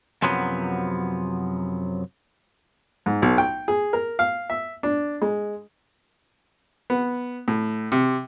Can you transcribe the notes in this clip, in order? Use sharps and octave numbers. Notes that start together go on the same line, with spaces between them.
F#2 C3 F3 F#3 B3
G#2
B1
G5
G#4
A#4
F5
E5
D4
G#3
B3
A2
C3